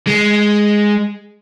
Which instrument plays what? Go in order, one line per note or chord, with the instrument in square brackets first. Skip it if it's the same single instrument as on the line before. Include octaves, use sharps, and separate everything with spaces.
[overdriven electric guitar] G#3